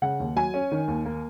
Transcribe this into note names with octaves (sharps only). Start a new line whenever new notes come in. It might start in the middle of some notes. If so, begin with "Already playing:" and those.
C#3 F#5
D#2
F#3 G#5
C#4
D#3
D#2
A#3